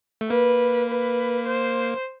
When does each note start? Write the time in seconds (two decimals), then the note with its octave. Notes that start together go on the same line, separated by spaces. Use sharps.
0.21 A3
0.30 A#3 B4
0.89 B4
1.46 C5